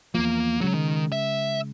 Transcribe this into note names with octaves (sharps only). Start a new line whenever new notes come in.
E2 F3 A#3
C#3 F#3 G#3
D#3
E5